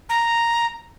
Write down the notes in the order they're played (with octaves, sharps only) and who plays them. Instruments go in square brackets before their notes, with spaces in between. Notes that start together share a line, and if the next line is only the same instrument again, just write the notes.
[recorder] A#5